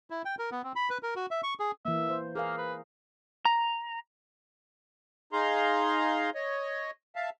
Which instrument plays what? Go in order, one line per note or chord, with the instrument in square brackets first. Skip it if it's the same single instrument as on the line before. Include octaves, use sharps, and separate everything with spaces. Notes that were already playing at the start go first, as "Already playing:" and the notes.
[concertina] E4
G5
A#4
B3
C4
B5
B4
A#4
F#4
E5
C#6
G#4
[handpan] E3 A#3 [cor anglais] E5
[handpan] C5
[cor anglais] A#3 [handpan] G#4 A#4 F5
[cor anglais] B4
[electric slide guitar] A#5
[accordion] D#4 G#4 F5 A#5 C6
C#5 D#5
E5 F5 A5